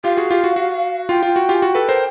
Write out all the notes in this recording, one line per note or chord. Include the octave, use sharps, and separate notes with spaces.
F4 G4 F5
F#4 G#4
F4 G4
F#4
F#4
F4 G5
F4
F#4
F4 G4
G#5
F#4 G5
A4 B4
A#4 C5